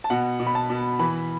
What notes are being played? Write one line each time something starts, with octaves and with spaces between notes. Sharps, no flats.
A5
B2 F#5
B2
B5
A5
B2
E3 B5